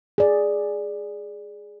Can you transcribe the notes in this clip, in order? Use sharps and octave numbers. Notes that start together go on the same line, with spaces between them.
G#4 D5